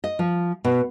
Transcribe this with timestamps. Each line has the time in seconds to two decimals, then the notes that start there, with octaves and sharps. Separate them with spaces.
0.04 D#5
0.19 F3
0.64 B2